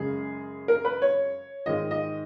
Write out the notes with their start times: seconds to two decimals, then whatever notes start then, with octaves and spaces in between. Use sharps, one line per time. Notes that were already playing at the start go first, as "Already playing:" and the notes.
Already playing: F#2 C#3 G#3 G#4
0.68 A#4
0.85 B4
1.02 C#5
1.66 G#2 D#3 G#3 D#5
1.91 D#5